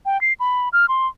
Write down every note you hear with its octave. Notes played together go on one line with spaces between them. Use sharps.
G5
C7
B5
F6
C6